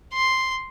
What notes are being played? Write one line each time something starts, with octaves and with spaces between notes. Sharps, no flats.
C6